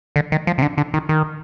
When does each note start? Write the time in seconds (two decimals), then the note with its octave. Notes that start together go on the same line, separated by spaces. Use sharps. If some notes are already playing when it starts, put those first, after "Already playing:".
0.16 D3
0.32 D#3
0.47 F3
0.58 C3
0.62 D3
0.78 D3
0.94 D#3
1.09 D#3